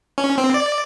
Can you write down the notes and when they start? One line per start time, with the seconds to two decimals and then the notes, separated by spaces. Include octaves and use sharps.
0.18 C#4
0.38 C4
0.54 D5